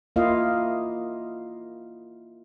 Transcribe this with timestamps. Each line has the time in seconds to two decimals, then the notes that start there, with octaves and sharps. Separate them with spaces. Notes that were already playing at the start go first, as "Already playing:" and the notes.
0.16 A#3 E4 F4 D#5 F5